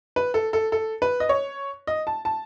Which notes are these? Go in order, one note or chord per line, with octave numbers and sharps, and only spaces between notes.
B4
A4
A4
A4
B4
D#5
C#5
D#5
A5
A5